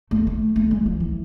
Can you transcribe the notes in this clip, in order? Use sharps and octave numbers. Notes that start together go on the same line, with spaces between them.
A3
A3
A3
G#3
F3
E3